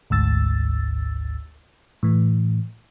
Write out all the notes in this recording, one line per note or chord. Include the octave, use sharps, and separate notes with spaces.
G#1 D2 G#2 E6 A6
A2 E3